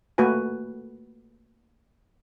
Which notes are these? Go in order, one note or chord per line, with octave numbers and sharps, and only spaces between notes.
A3 A#3 F#4 B4 G#5